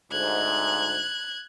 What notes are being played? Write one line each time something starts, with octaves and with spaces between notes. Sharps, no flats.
D2 G#2 F#6 G#6